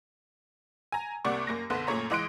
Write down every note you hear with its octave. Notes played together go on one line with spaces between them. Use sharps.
G#5 A#5
C2 C3 A#3 D5 F#5 C#6
F#2 A#3 A#6
F#1 B1 D3 B3 C6
F#2 A#2 A3 C#5 A#5
C#2 E3 D#5 C6 F#6 D7